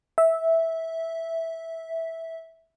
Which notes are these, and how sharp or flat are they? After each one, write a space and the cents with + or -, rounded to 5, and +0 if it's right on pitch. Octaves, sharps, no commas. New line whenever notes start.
E5 -10